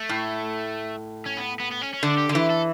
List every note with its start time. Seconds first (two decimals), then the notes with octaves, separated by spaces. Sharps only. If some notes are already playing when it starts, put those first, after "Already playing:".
Already playing: A3
0.09 A2
1.26 C#4
1.38 B3
1.60 B3
1.71 B3
1.81 C#4
1.93 C#4
2.03 D3 D4
2.18 G4
2.29 D3
2.35 E3 G4
2.50 A4